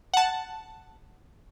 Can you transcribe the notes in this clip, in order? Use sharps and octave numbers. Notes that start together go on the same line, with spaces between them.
F#5 A5